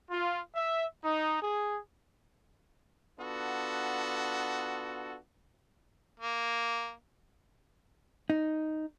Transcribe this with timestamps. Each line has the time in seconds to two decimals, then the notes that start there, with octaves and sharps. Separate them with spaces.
0.10 F4
0.54 E5
1.03 D#4
1.41 G#4
3.18 B3 D4 F4 F#4 A4
6.20 A#3
8.30 D#4